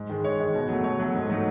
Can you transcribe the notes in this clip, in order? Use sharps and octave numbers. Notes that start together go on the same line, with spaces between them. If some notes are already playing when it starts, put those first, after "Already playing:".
Already playing: G#2
D#3 G#3
G#2 C#5
D#3 G#3
B2
F#3 A3
B2 C#5
F#3 A3
G#2
F#3 A3 D#4